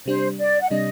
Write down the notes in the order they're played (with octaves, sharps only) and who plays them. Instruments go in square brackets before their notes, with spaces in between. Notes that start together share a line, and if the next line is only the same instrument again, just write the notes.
[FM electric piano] C3 G3 D4 [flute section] C5
[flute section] D5
F#5
[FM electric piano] C3 G3 D4 [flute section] D#5